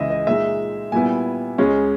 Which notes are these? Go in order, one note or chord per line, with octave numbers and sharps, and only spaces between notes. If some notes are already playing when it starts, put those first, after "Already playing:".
Already playing: C#2 C#3 E3 D#5 E5
D#5
A#2 G#3 D#4 E5
A#2 G3 B3 E4 G#5
C#2 C#3 G#3 C#4